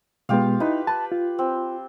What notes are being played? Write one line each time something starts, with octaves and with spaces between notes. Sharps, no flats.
B2 G#3 B3 F4 G4 F5
D#4 E4 B4
B4 A5
F4
C4